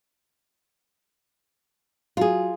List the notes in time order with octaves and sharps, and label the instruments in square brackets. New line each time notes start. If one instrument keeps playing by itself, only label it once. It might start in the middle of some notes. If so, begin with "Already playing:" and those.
[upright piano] F#3 [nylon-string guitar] F4 G#4